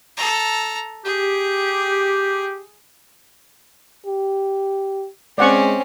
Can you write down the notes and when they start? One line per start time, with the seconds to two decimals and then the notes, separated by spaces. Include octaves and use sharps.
0.17 A4 A#5
1.05 G4 G#4
4.06 G4
5.38 G#3 C4 C#4 D5 F#5 C#6